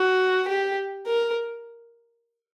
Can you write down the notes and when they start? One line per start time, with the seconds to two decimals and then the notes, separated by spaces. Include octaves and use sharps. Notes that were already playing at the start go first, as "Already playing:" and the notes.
Already playing: F#4
0.48 G4
1.06 A#4